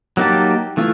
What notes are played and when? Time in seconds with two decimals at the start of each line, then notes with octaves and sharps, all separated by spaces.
0.17 F#3 A#3 D#4 G4 A5
0.77 E3 A3 E4 F4